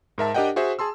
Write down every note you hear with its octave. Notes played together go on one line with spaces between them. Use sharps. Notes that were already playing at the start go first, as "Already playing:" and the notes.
G#2 A#4 E5 A5
D4 G4 A#4 D#5 F#5 G5
F#4 G#4 C5 E5
G#4 A5 C6 E6